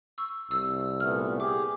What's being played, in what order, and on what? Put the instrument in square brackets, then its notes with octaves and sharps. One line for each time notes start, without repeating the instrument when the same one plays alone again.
[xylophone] C#6 E6
[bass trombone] C2 [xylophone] E6
[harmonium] A#2 A3 B3 [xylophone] F6
[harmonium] G4 G#4 [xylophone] D6